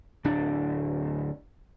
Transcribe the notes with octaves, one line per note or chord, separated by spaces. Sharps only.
D1 D4